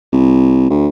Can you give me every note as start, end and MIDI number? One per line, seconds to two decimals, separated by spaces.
0.12 0.69 36
0.70 0.87 38